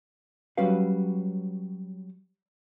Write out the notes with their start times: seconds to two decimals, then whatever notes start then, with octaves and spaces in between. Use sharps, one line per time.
0.57 F#3 G3 C#4 F#4 B4 F5